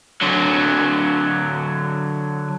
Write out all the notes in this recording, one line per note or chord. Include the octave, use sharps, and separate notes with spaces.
D3 F#3